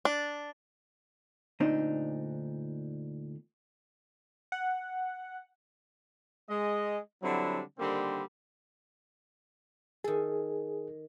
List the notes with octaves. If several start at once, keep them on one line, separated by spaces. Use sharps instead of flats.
D4
D2 A#2 C4 D4 D#4
F#5
G#3 D#5
D3 F#3 G3 C4 D4 E4
D3 D#3 G3 A#3 C4
D#3 G#4 A4